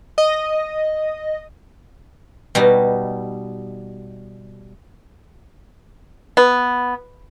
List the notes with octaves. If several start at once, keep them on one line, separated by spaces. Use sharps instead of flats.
D#5
B2 G3 D#4
B3